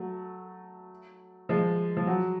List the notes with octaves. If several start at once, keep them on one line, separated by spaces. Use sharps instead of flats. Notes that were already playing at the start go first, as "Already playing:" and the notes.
Already playing: F#3 A3
F3 G#3
F3
F#3